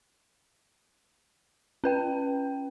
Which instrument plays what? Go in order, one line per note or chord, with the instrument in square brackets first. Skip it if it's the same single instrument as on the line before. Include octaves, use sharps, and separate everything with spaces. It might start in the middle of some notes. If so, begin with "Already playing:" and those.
[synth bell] C#4 B4 G5